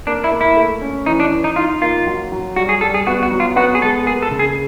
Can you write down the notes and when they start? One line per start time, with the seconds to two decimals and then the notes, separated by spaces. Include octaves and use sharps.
0.07 A#3 D4
0.24 E4
0.32 A#3
0.41 E4
0.57 A3
0.82 C#4
1.06 E3 D#4
1.20 D4
1.32 E3
1.44 D#4
1.56 D#4 F4
1.82 A#3 F4
2.07 F#3
2.32 F#3
2.56 G3 F#4
2.69 G#4
2.81 G3 A4
2.94 G#4
3.07 B3 F#4
3.23 F#4
3.31 F#3
3.40 F4
3.56 B3 F#4
3.75 G#4
3.81 G#3 A4
4.06 A#3 G#4
4.23 A4
4.31 C#3
4.39 G#4